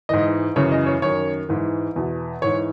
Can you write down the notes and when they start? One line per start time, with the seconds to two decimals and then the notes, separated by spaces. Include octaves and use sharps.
0.09 G#2 E3 D#5
0.56 F#2 C#3 E3 C#5
0.72 D#5
0.86 C#5
1.02 F#2 D#3 C#5
1.49 G#2 E3
1.96 E2 B2
2.42 G#2 E3 C#5